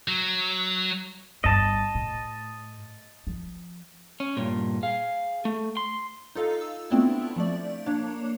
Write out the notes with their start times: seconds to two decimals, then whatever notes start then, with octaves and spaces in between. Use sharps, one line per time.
0.08 F#3
1.44 G1 G2 D#5 A5
1.95 A2
3.27 F3
4.20 C#4
4.37 G2 A#2
4.83 G#4 F5
5.45 A3
5.77 C6
6.35 D#4 F4 A4 D#5 F5
6.61 E6
6.90 A3 B3 C4 D4 E4 F4
7.36 F3 A3 D5
7.86 A#3 D4 C#5